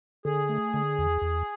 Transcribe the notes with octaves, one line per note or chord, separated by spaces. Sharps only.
D3 G#4
A3
D3
E2
E2